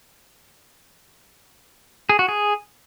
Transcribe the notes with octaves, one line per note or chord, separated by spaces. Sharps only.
G#4
F#4
G#4